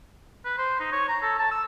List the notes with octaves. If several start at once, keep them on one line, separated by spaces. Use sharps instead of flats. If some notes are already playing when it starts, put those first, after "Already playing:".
B4
C5
D#4
C#5
A#5
A4
A5
E6